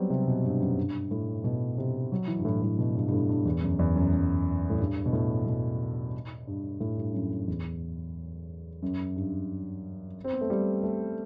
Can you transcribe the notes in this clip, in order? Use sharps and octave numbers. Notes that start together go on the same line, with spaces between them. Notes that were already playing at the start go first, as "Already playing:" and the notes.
Already playing: F#3 G3 B3 C4
C3
B2
G2
F#2
G2
A2
B2
C3
F#3
E3
G2
A2
A2
B2
G2
G2
A2
G2
E2
F#2
E2
F#2
F#2
A2
G2
B2
A2
B2
G2
A2
G2
F#2
E2
F#2
G2
C4
B3
A3
G3
A3